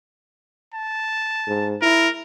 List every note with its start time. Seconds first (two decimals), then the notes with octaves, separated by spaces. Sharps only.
0.74 A5
1.48 G#2
1.82 E4 A#4